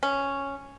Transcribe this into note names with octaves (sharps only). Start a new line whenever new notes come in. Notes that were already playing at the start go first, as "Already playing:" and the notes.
C#4